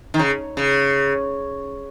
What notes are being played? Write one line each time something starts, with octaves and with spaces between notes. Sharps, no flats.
D#3
C#3
C#3